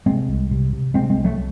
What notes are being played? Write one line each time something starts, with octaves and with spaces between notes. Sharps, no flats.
C3 G#3 C4
C2
C3
C3
C3 G#3 C4
G#3 C4
C2
F#3 A3